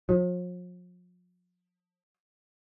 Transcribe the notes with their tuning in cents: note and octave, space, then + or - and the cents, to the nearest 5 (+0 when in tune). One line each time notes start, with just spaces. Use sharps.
F3 +45